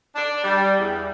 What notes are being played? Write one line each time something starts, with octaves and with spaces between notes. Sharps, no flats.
D4
G3
E2